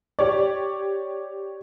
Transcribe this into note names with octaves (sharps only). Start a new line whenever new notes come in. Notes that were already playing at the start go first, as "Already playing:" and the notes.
G4 C#5 D5